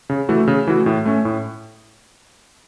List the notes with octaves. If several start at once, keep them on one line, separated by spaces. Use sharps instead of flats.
C#3
E3 A3 F#4
C#3
E3 A3 F#4
A2
A3 C#4
A2